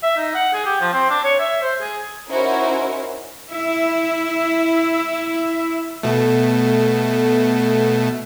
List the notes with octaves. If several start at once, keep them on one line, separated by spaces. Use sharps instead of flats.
E5
D#4
F#5
G#4
G4
F3
C4
D4
C#5
E5
C5
G#4
C#4 D#4 E4 F#4 A#4 C5
E4 E5
B2 A3